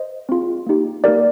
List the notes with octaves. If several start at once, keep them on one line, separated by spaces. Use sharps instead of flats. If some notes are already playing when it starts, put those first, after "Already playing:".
Already playing: C5 D#5
C4 F4 G#4
A#3 D#4 G4
A#3 D#4 G4 A#4 D5